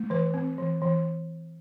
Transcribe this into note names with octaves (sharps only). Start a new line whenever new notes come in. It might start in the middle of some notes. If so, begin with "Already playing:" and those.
Already playing: A3
E3 B4
C4
E3
E3